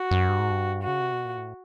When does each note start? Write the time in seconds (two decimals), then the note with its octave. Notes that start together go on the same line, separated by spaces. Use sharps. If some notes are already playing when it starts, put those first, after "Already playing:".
Already playing: F#4
0.11 F#2
0.29 G2
0.39 G#2
0.51 G2
0.83 C#3 F#4
1.00 C3
1.13 B2
1.25 A#2
1.37 A2